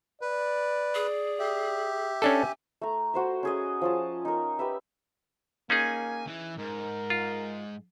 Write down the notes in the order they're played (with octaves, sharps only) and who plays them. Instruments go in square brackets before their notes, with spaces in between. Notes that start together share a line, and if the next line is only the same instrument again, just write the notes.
[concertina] B4 [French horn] D5
[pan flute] G#4
[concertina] G4 E5
[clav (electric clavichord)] C#4 D4 A4 [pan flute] G#5
[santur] A3 A#5
F#4 C5 E5
C#4 G#4 D#5
F3 C#4 A5
D#4 A#4
G4 B4 E5
[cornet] A#3 [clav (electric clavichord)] C#4 D#4 G#4 [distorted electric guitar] G#5
[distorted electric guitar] E3
[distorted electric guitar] G#2 [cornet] A#4
[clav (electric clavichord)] F4